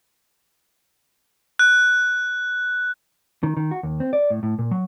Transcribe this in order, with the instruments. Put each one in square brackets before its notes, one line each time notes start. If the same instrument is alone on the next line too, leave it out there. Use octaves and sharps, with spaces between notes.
[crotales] F#6
[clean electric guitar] D#3
D#3
F#4
D#2
C4
D5
A2
A2
A#2
F#3